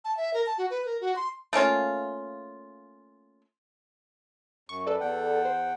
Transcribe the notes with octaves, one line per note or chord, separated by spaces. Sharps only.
A5
E5
A#4
A5
F#4
B4
A#4
F#4
C6
A3 A#3 C#4 F4
F#2 C#6
A4 B4 D5
E2 F#5 G5
C5